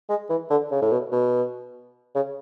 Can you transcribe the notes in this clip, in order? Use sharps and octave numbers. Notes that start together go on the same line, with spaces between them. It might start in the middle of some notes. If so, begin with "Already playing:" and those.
G#3
E3
D3
C#3
A2
B2
B2
C#3